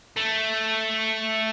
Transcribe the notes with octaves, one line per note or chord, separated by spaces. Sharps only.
A3